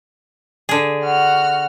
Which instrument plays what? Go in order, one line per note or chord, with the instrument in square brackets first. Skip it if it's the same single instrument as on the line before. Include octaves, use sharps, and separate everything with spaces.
[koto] D3 G#4
[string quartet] F#4 F6